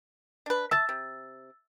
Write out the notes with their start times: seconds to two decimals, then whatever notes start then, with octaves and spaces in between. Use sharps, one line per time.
0.46 D4 B4
0.71 E5 A5 E6 A6
0.89 C3